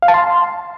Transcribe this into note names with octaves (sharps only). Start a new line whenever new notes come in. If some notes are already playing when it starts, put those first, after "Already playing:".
F5
A5
C6